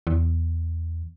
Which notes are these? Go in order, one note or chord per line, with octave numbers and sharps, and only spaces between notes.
E2